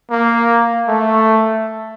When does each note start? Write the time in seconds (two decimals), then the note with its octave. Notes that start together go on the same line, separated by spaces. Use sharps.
0.11 A#3
0.88 A3